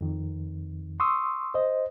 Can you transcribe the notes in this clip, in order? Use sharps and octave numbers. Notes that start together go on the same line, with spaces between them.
F2 D#3
C6 C#6 D#6 E6
C5 D#5